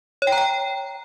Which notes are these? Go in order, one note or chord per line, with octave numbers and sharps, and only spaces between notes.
C#5
G5
A#5
G5